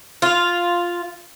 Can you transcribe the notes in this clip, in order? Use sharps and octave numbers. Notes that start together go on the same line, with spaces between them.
F4